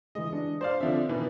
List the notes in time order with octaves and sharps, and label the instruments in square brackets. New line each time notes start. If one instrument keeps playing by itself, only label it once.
[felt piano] E3 G#3 [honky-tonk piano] D#5
[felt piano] D4
[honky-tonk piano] C5 D5 F5
[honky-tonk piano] D3 F3 E5 [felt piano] C4 D4
[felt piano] D5
[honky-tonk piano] B2 D#3 E3 [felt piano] B4